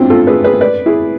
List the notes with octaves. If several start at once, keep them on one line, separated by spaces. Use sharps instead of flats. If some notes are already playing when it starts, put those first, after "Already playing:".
Already playing: C4 D4 E4 F4
F4 A4
G#4 B4
G#4 B4
B4 D5
E4 G#4